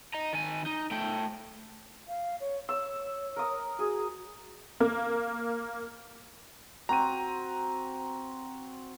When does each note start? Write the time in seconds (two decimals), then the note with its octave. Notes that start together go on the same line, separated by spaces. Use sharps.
0.14 D#5 A#5
0.33 D#3 G#5
0.66 D#4
0.91 A3 G5
2.08 F5
2.40 C#5
2.69 C#5 E6
3.36 A#4 D#6
3.79 F#4 G#4
4.80 A#3
6.89 C4 F#4 A#5 D#7